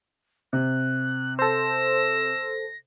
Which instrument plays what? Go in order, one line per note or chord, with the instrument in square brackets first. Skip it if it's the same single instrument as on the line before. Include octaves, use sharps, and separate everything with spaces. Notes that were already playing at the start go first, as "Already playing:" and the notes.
[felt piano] C3 [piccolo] F#6
[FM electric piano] A4 C5 [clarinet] E6 [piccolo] A#6